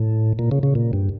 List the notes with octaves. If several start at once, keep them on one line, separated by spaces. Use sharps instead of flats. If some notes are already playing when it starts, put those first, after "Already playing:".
Already playing: A2
A#2
C#3
C#3
A#2
G2